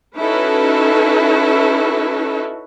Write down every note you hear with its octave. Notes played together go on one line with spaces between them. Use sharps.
C#4 D#4 E4 F#4 A4 B4